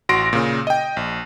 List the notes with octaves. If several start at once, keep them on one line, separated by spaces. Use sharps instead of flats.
A1 F#4 C6 A#6 D7
A#2 C#3
D#5 G5
A#1